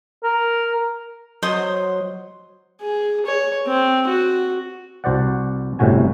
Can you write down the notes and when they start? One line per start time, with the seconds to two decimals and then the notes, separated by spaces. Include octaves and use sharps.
0.23 A#4
1.43 F#3 C5 D#5 C6 D#6
2.82 G#4
3.26 C#5
3.67 C4
4.07 F#4
5.04 C2 F#4 C5 D5 F#5
5.79 G1 A2 C3 F#4 G#5